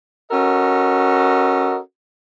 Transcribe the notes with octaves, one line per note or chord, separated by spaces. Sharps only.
C#4 F#4 A4 A#4 D#5